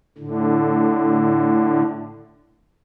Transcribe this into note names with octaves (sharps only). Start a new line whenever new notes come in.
A2 D3